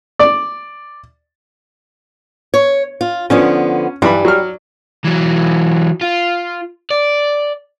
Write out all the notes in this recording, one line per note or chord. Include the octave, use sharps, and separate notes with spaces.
D5
C#5
F4
D3 F3 B3 C#4
G2 E3 G3 B5
F#3 F6
E3 F#3
F4
D5